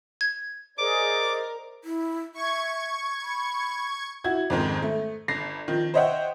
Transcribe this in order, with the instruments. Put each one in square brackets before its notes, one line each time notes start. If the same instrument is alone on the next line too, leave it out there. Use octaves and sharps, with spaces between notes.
[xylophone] G#6
[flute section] G#4 [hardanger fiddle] A#4 [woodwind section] C5 D5 D#5 [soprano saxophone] D6
[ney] E4
[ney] E5 [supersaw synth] C#6 G#6
[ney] B5
[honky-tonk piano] E4 F#4 G#6
F2 G#2 D#3 G#3
A3
G1 A#6 C7
D#3 F3
C5 C#5 D#5 E5 F#5 G5